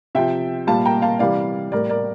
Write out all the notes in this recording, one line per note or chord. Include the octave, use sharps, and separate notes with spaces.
C3 F3 E5 G5
A#2 G3 F5 A5
G5 A#5
F5 A5
C3 E3 G3 D5 F5
A2 G3 A#4 D5
A#4 D5